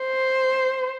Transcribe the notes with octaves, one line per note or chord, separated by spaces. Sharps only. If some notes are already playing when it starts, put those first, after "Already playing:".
Already playing: C5